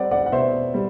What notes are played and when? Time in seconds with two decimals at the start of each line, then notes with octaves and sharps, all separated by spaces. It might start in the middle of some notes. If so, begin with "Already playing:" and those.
Already playing: G3 C4 D5 F#5
0.11 D5 F#5
0.26 F#5
0.32 B2 C5 E5
0.74 G3